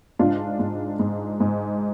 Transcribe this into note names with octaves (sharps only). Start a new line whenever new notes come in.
G#2 D4 F4
G#2
G#2
G#2